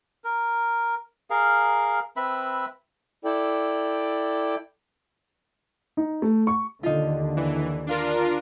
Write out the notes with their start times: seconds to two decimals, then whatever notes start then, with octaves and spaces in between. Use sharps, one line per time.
0.24 A#4
1.30 G#4 A#4 F5
2.16 C4 B4 E5 B5
3.25 E4 A4 D5 G5
5.97 D#4
6.22 A3
6.47 C#6
6.83 D#2 D3 D#4 F4
7.37 E3
7.87 D4 F4 A#4